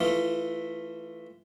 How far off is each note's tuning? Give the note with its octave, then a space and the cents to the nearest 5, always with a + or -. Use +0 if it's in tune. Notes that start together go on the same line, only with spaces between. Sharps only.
E3 +0 A3 +0 F4 -20